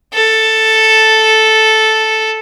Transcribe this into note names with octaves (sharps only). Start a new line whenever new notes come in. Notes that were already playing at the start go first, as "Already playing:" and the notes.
A4